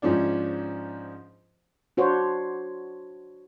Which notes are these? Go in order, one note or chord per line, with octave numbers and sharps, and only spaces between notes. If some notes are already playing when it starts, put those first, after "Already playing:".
G#2 F3 C#4 D4
D4 F#4 C5 C#5